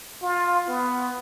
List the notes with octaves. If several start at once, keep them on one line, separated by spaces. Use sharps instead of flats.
F4
B3